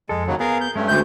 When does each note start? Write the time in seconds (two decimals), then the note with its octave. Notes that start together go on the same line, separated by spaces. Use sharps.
0.09 F2 G#3 A4
0.27 D#2 C#3 F#3
0.40 B3 G#4 A#4 F5
0.61 G6
0.76 G2 G#3 A3 C#4
0.88 D2 G6